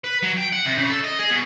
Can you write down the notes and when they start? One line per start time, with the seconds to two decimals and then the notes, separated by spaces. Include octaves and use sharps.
0.04 B4
0.23 F#3
0.37 G5
0.52 F#5
0.65 C3
0.77 C#3
0.90 A4
1.04 D#5
1.19 G#4
1.31 B2